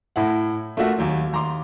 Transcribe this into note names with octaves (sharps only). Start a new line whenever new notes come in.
A2 E4 F#5
A3 A#3 F4 F#4 E5 F#5
D#2 F#3
D#2 A#5 C6 D6